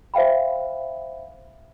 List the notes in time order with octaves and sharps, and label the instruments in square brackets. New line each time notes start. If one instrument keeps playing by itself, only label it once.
[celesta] C5 E5 F5 G5 B5